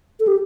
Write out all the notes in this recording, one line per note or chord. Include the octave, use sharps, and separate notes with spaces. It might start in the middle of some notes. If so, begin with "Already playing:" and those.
A4
G4